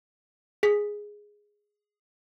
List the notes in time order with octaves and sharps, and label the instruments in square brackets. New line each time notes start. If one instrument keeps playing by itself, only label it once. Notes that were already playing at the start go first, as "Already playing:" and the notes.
[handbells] G#4 B6